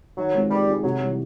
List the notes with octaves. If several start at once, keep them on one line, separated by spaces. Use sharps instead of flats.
D#3 F#3
G#3 C4 F4 G#4
D#3 G3
G#3 C4 F4 G#4
C3 F#3
E3 G3